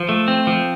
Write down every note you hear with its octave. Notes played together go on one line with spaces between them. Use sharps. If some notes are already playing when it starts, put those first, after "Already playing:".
Already playing: F3
A3
C4
F3